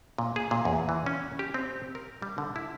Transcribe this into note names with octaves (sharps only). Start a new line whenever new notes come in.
A#2
G#4
A#2
E2
E3
C#4
G4
C4
A#4
G3
D3
E4